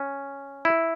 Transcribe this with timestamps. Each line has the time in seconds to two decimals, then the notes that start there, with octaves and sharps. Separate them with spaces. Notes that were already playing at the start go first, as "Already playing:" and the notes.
Already playing: C#4
0.65 E4